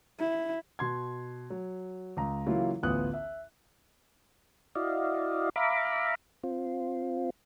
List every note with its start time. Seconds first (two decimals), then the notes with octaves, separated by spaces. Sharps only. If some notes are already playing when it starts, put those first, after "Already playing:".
0.19 E4
0.79 B2 C6 G#6
1.50 F#3
2.17 C#2 A#5
2.46 C#3 E3 F#3 A#3 E4 F4
2.83 A1 D2 B3 F4 D#6 F#6
3.14 E5
4.75 E4 F#4 D5 D#5 F5
5.56 E5 F5 A#5 B5 D6
6.43 C4 F4